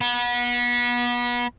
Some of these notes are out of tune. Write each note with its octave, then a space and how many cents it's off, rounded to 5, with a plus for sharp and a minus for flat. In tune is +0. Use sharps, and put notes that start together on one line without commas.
B3 -30